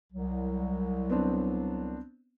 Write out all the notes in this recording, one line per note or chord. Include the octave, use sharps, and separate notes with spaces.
C2 F#3
B3 C4 D4